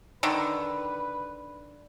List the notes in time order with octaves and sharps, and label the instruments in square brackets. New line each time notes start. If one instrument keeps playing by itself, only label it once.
[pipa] D3 D#3 [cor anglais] B4